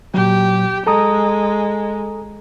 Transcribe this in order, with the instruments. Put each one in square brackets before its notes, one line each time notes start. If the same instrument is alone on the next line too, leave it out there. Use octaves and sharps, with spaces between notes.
[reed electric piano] A#2 F#3 [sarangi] G4
[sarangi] G#3 [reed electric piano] A4 A#5 D#6